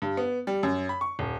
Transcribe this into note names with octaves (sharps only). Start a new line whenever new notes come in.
G2
B3
G3
F#2
B5
C#6
D#1